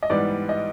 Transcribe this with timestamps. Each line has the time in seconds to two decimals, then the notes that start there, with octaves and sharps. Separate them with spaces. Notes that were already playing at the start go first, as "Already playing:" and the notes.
0.03 D#5
0.10 G#2 E3 G3 B3 D5
0.49 D#5